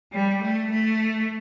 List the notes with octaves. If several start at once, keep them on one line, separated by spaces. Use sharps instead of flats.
G3
A3
A3